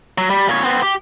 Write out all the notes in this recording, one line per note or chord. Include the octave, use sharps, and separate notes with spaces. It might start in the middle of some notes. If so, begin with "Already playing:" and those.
F#3
G3
A#2 C#5
B3 C4
G4